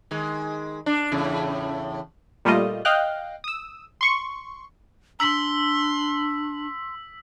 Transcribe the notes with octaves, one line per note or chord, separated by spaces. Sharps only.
D#3 G#3
D4
E2 A2 C#3
A#2 G3 A3 F4 D#5
D#5 F5 G5 F6 F#6
D#6 E6
C6 C#6 C#7
D4 A#5 C6 E6 B6 F#7